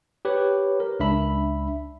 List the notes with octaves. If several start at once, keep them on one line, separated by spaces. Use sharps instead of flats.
G4 B4 C#5
A#4
C#2 D4 E5 B5